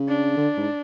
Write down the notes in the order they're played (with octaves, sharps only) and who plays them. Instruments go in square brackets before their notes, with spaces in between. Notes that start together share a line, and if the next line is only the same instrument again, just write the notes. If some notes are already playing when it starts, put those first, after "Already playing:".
Already playing: [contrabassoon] C#3
[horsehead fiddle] D4
[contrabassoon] D3
G#2